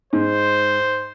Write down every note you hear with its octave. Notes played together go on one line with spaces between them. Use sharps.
G#2 C5